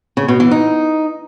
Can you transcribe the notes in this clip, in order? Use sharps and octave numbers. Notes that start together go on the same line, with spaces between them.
C#3
B2
E3
D#4